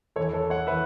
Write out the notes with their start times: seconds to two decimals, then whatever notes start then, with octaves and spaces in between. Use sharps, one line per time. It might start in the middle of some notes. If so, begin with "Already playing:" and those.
0.16 E2 A4 C#5
0.21 E3
0.33 A4 C#5
0.50 C#5 F#5
0.67 E3 B4 E5